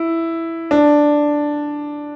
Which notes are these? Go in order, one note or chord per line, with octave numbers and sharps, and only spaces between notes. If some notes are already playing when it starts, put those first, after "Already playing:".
Already playing: E4
D4